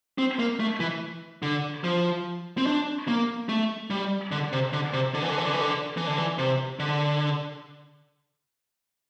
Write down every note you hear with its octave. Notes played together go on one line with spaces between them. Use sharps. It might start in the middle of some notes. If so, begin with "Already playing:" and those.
C4
A#3
A3
E3
D3
F3
C4
D4
A#3
A3
G3
D3
C3
D3
C3
D3
E3
D3
E3
D3
E3
D3
E3
D3
E3
C3
D3